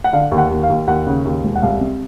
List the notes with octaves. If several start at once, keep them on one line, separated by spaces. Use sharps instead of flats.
F#5
D3 F5
D#2
F#5
D#2
F5
D#2
D#2 F#5
C#3
D#2
E1
F#5
C2 F5
C3